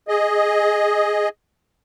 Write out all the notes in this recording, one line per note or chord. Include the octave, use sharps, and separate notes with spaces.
G#4 D#5